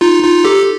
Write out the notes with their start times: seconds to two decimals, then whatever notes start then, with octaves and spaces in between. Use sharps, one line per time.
0.01 D#4 F4
0.23 D#4 F4
0.44 G4 A4